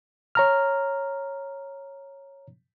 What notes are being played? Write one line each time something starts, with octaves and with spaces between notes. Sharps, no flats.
C#5 A#5 F6